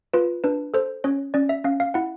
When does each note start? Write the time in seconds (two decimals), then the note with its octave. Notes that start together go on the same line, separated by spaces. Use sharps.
0.14 F4 B4
0.44 D4 B4
0.74 A4 C5
1.04 C#4 C#5
1.34 C#4 D5
1.49 E5
1.64 C#4 F5
1.80 F5
1.94 E4 F#5